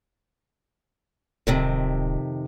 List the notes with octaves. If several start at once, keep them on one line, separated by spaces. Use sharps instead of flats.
D1 F2 C3 D#3